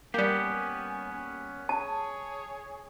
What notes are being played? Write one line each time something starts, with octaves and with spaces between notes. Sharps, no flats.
G3 A#3 B3 C#4 G4 G#5
C#4
G#4 C#5 A5